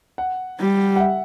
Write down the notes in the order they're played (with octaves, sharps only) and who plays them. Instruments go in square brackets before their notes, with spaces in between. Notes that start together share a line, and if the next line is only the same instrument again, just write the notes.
[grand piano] F#5
[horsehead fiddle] G3
[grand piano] F#5
E5